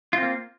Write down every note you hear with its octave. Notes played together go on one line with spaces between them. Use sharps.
A#3 C4 F4